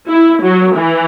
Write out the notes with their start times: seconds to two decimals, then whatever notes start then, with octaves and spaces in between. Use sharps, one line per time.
0.10 E4
0.44 F#3
0.76 E3